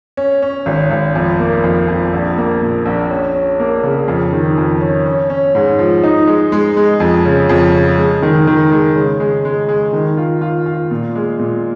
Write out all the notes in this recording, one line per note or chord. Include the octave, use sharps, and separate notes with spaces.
C#4
C#4
G#1
G#1
F2
A#3
F2
F2
A#1
A#3
A#2
A#1
C#4
C#4
A#3
C#3
F2
D#3
F2
C#4
C#4
C#4
G#2
F3
D#4
G#3
G#3
G#3
F2
C#3
F2
C#3
G#3
D#3
D#3
G#3
C#3
G#3
G#3
G#3
D#3
F4
F4
F4
A#2
G#3
A#2